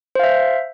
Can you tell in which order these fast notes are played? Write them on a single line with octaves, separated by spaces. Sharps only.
C5 F5 E5